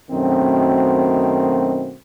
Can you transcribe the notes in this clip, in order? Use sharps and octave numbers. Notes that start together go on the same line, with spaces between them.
F#2 B2 D#3 A3 C4